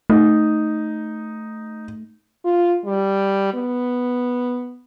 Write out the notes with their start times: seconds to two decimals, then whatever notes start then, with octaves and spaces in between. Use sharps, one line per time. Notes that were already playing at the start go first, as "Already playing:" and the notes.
0.10 A3 D#4
2.45 F4
2.85 G3
3.54 B3